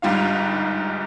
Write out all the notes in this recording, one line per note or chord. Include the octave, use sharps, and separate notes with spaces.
G1 G#2 G3 F4 F5